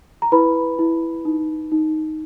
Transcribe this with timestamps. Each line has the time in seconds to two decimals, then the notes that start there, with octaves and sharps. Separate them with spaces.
0.22 A#5
0.32 E4 B4 B5
0.79 E4
1.25 D#4
1.72 D#4